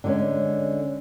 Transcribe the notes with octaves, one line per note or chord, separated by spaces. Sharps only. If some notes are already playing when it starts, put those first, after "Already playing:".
D3 G#3 C#4